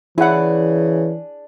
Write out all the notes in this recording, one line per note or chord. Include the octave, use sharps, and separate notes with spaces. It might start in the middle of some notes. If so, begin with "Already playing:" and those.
C#3 E3 D4 E4 G#4 F#5